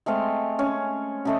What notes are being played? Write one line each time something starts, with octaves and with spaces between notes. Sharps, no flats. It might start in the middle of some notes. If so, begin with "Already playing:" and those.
G#3 A3 C4 F5
C#4
C#3 A3 D#5